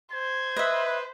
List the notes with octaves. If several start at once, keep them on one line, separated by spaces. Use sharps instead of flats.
C5 G#6
B4 D#5 E5